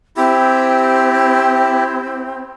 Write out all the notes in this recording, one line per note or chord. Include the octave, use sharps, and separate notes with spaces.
C4 E4 G4